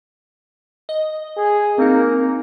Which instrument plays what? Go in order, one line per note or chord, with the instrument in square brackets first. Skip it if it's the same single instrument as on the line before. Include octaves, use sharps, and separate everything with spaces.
[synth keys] D#5
[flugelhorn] G#4
[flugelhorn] A#3 [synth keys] C4 D#4